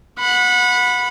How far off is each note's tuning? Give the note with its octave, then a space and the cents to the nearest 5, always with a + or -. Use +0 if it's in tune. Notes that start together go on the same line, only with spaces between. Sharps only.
F#5 -25 B5 +0